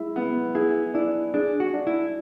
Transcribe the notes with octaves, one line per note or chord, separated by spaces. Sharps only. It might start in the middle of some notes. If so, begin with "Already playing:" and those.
Already playing: G#3 E4
B3
E4 G#4
D4 E4
D4 G#4
F#4
D4
E4